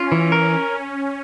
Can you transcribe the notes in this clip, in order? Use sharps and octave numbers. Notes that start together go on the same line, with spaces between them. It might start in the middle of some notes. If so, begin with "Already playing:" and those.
Already playing: C#4 F4
E3
A#4